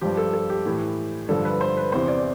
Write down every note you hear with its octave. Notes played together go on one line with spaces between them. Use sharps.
G2 F3 G4
A4
A4
G4
A2 E3
G2 D3 F3 A4
B4
C5
B4
E2 C3 E3 C5
D5